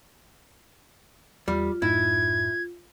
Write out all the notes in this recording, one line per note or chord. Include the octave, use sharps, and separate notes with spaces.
E2 G3 F4
F#2 A2 D#4 E4 G#6